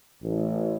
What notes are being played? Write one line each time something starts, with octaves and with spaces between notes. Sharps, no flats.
A1